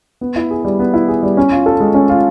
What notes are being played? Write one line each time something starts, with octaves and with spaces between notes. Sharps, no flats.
B3
E4
G#4
G3
B3
E4
G#4
G3
C#4
F4
A4
G#3
C#4
F4